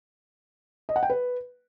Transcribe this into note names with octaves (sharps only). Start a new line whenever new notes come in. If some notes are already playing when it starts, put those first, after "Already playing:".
D#5
F#5
G5
B4